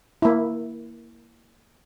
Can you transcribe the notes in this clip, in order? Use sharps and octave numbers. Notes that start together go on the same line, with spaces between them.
A#3 E4